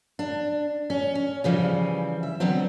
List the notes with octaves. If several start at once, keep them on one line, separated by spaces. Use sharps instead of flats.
D4
C#4
C#4
C#3 E3 F3 G3
E5
D3 F#3 B3 C4